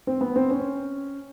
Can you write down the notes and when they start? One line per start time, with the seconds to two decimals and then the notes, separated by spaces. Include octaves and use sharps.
0.07 C4
0.21 B3
0.36 C4
0.51 C#4